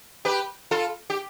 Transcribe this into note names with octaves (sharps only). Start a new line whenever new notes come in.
G4 B4
F4 A4
G4